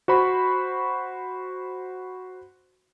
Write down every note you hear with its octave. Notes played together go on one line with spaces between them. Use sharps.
F#4 C5 B5 C#6